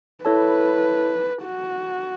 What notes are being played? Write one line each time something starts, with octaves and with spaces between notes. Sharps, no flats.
E4 A4 B4 C#5 A5
F#4